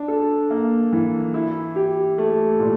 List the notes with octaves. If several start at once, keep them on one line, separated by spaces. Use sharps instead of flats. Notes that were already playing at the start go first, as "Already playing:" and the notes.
Already playing: D4
A4
A#3
E3
E4
G4
A3
A#2